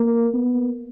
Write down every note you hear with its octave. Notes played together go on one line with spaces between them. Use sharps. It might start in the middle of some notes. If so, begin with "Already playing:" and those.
Already playing: A#3
B3